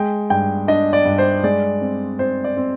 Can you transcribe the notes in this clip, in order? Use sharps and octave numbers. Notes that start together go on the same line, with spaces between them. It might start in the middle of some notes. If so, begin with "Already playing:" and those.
Already playing: G#3 G5
G2 G5
D4 D#5
D5
G2
C5
G#3 D5
C4
C4 C5
D5
C4